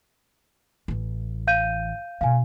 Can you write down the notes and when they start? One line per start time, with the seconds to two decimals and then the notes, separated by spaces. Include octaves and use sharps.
0.88 A1 E3
1.47 F5 G6 D#7
2.21 B2 D4 F5 G#5